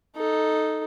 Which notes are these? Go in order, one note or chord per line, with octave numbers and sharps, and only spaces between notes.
D#4 A4